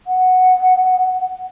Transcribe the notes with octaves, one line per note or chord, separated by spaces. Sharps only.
F#5